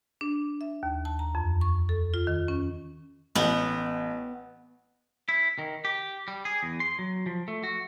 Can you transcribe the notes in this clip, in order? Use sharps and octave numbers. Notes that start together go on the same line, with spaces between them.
D4
E5
D#2
A5
A#5
F2
C#6
A4
F4
D#3
C#4
A1 B3
E4
D#3
G4
G3
G#4
E2
C6
F#3
F3
A3
F#4